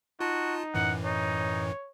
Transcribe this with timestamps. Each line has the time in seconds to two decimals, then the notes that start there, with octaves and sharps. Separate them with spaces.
0.20 D#4 F4 F#4 A5
0.74 F#2 A2 E3 F#5
1.05 D#4 C#5